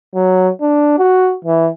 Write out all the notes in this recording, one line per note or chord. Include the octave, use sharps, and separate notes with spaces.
F#3
D4
F#4
E3